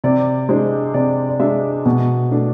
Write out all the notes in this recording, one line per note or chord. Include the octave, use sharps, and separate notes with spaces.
C3 D5
G#3 D4 C5
C3 D5
D5
G#3 D4 E5
B2
A3 D4